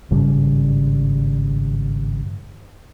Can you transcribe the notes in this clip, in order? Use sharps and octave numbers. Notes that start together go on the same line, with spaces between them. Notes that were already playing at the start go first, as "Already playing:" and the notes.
G#1 G2 C#3 G3